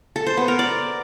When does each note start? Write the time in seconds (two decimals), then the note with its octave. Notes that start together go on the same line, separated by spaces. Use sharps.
0.16 A4
0.27 C5
0.37 B3
0.48 A#4
0.59 D5